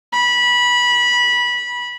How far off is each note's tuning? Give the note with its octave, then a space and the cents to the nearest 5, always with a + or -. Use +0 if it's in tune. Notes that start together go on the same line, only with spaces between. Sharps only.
B5 -20